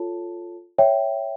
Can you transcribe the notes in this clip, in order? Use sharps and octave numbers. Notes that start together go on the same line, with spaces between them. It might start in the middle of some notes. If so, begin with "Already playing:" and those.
Already playing: F4 A4 C#5 A5
C#5 E5 G5